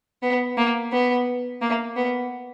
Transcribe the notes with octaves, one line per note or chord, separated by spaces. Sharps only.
B3
A#3
B3
A#3
B3